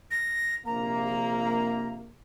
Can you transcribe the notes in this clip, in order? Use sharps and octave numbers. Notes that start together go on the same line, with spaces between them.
A#6
A#1 C3 A#3 A#5